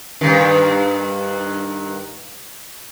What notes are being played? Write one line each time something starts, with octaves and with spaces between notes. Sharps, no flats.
G2 D#3